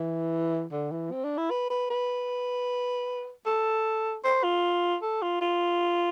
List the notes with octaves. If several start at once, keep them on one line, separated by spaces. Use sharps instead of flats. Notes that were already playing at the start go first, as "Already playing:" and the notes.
Already playing: E3
D3
E3
C4
D4
E4
B4
B4
B4
A4
C5
F4
A4
F4
F4